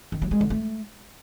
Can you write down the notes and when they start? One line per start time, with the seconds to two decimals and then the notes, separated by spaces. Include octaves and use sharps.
0.12 D#3
0.22 F#3
0.31 G#3
0.41 D3
0.50 A3